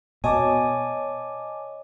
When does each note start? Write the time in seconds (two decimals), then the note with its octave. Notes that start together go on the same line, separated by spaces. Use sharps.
0.24 B2 C#5 D#5 G#5 A5 D6